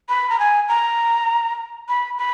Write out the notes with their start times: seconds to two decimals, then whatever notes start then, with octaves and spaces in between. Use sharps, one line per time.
0.09 B5
0.30 A#5
0.39 G#5
0.69 A#5
1.89 B5
2.18 B5